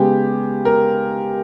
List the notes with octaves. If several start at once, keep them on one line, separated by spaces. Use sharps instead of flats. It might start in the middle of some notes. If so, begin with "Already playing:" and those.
Already playing: C#3 G#3 B3 G4
A#4